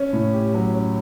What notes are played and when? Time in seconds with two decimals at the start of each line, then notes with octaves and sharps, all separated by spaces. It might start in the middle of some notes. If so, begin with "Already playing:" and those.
Already playing: C#4
0.13 A2
0.33 G4
0.54 F#3
0.74 C#4